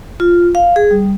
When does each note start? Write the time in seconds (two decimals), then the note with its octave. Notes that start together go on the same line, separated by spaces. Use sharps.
0.20 F4
0.55 F5
0.76 G#4
0.91 G3